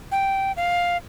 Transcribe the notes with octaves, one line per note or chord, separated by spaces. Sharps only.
G5
F5